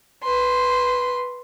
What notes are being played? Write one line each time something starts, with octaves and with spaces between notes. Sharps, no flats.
B4 C6